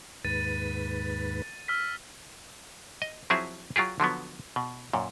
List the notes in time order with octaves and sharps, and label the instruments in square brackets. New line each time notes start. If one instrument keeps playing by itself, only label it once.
[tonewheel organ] D#2 G#2 B4 [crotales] A6 D#7
[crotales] E6 F6 B6
[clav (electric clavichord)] D#5
F3 F#3 C4 E4 G#4 E5
F#3 F4 G4 G#4
D3 F3 F#3 B3
B2
F#2 A#2